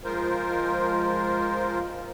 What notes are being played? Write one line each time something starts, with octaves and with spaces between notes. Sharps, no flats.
F3 G#3 F4 A#4 C5